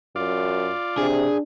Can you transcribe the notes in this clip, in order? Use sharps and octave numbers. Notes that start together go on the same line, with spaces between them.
F#2 F4 D5
C3 D4 G#4